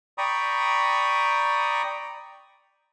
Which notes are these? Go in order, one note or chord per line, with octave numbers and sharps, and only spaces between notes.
D5 G5 A#5 B5 C#6 D#6